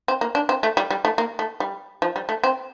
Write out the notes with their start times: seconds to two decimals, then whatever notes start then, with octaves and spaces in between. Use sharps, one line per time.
0.08 C4
0.21 A#3
0.35 D4
0.49 C4
0.63 A3
0.77 G3
0.90 G3
1.05 A3
1.18 A#3
1.39 A3
1.60 G3
2.02 F3
2.16 G3
2.29 A3
2.44 C4